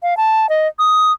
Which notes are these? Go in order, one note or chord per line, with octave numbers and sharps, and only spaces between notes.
F5
A5
D#5
D#6